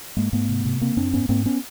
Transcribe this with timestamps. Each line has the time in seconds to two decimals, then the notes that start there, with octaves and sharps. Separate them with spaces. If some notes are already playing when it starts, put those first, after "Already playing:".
0.17 G#2 G#3 A#3
0.33 G#2 A3 B3
0.49 C3
0.65 C3
0.81 C#3 A#3 C4
0.97 F#2 C4 D4
1.13 G#2 B3 C#4
1.29 G#2 A#3 C4
1.46 B3 C#4